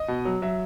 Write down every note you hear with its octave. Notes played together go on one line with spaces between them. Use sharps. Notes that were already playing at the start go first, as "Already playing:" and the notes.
Already playing: D#5
B2
F#3
F#3 E5